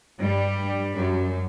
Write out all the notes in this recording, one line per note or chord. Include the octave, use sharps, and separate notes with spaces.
G2 G3
F#2 F#3